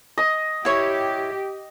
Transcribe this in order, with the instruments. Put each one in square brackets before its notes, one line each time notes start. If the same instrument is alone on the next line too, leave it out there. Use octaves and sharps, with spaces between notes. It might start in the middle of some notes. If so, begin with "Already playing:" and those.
[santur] D#5
[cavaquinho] E4 C#5 [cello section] G4